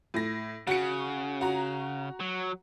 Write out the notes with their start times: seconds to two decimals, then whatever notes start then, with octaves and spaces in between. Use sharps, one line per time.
0.14 A2 A#6
0.67 C#3 F#4 C#7
1.41 F#4 A#5
2.20 F#3